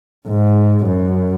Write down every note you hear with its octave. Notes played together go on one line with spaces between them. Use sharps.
G#2
F#2